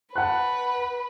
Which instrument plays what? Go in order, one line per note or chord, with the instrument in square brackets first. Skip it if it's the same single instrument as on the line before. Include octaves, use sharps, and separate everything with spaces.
[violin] B4 [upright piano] F#5 A5 F#6